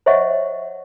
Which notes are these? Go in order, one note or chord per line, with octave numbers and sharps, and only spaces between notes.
C5 C#5 D#5 E5 F#5 C#6